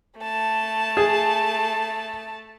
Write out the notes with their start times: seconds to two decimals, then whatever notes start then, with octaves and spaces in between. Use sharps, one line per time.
0.20 A3 A5
0.97 G#4